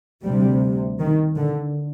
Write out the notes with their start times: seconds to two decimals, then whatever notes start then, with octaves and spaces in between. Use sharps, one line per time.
0.23 D2 C3 G3
1.00 D#3
1.38 D3